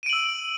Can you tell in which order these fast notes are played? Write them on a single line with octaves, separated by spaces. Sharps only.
D#7 D7 F#7 E6